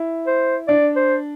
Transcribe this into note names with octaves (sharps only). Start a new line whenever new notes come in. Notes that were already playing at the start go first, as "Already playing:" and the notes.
Already playing: E4
C5
D4 D5
C5